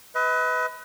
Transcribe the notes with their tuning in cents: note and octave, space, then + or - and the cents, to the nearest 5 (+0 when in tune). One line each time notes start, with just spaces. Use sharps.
B4 +15 D#5 +40